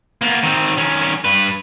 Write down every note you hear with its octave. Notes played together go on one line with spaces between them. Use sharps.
A#3 B3
D#3 C4
D#3 C#4
G2 B4